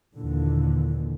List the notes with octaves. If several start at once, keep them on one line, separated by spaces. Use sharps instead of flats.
D#2 A#2 D3 E3